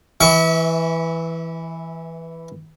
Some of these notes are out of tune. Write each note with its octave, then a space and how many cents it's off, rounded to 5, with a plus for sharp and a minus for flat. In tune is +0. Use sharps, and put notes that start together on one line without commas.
E3 +0 E5 -30 C#6 +25